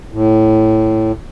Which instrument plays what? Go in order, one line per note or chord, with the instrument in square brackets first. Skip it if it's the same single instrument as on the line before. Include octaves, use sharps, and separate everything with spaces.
[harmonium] A2